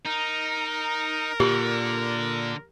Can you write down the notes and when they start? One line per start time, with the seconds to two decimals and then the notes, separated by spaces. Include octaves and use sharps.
0.06 D#4 A#4
1.40 A#2 D3 G4 C#6